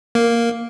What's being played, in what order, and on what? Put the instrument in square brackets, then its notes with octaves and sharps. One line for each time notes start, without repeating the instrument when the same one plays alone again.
[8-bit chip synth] A#3